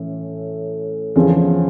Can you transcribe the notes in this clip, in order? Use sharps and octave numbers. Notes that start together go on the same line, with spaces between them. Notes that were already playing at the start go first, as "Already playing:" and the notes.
Already playing: A2 E3 A3 C#4
E2 C#3 F3